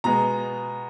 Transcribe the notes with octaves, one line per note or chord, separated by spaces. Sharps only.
B2 G#3 B3 A#5